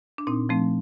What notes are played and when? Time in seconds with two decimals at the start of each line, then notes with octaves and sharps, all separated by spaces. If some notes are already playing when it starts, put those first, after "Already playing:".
0.18 D4
0.27 A#2 C4 D#4
0.49 F3 A3 C4